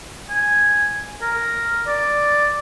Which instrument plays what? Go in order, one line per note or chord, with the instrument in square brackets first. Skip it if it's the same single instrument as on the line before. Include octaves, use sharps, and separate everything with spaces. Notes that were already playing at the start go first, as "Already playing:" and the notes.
[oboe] G#5
A#4
D5